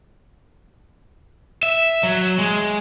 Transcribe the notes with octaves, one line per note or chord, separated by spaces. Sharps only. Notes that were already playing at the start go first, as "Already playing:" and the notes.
E5
F#3
G#3